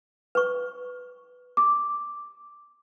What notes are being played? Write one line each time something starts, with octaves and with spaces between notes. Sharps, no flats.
B4 C#6
D6